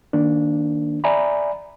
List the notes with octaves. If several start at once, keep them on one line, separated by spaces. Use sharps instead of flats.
D#3 A#3 D4
D5 E5 G#5 A#5 B5